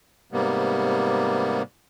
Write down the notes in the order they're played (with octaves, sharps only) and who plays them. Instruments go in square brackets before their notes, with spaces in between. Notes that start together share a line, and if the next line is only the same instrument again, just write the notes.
[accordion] G#2 C3 G3 A#3 B3